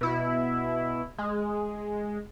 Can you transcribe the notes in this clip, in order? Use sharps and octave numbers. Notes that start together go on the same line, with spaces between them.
B2 E4
G#3